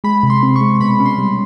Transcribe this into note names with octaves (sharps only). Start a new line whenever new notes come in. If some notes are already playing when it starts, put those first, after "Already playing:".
G#3 B5
C3
C6
C4
C#6
G#3
B2 B5
C#4
C6
G3